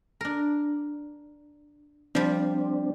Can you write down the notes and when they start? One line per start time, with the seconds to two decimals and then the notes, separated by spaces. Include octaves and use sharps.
0.21 D4 A#4
2.15 F3 G3 C4 D4